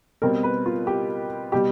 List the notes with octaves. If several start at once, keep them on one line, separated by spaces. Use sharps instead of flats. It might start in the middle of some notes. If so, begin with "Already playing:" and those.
B2 G3 C4 A#4
B4
F4
G4
B2 G3 G4